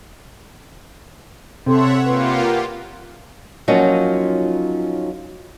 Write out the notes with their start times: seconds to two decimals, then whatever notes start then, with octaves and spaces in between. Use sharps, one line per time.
1.66 C3 A4 C#5 E5 F#5 C6
2.04 A#3 F4 G4 B4 F#5 C6
3.68 F3 F#3 A#3 C#4 D#4 F4